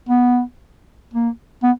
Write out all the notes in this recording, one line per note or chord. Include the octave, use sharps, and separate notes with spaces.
B3
A#3
B3